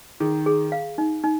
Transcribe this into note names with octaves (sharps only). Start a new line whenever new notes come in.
D#3 G#4
G#4
F5
D#4
D#4